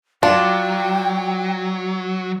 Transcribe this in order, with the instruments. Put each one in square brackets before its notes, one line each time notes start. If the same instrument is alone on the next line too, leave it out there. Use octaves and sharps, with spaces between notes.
[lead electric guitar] F#3 [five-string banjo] D4 [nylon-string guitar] F4 [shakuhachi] G5